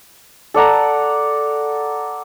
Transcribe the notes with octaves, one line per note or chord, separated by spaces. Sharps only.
A4 D5 F#5 A#5